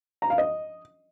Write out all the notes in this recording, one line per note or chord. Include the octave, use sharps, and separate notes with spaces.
A#5
F5
D#5